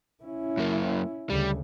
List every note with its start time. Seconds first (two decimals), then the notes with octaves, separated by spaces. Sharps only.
0.24 C#4 E4
0.57 F#2 A#3
1.30 D2 C#3 G3